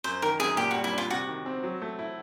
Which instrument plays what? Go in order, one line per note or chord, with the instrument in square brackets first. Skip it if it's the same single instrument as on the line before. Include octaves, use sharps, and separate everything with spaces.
[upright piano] F#2 [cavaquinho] C5
[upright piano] D#3 [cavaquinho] A#4
[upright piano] F#2 [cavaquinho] G#4
[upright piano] A#2 [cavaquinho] G4
[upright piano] G3 [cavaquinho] F#4
[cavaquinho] E4
[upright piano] D4
[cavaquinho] F4
[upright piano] C3 [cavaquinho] F#4
[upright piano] D#3
C4
F#3
A3
E4